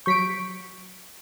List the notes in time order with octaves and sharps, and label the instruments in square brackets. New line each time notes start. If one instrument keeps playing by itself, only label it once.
[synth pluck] F#3 G6 [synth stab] C#6 B6 D7